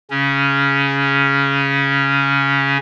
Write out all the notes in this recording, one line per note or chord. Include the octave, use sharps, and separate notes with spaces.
C#3 C#4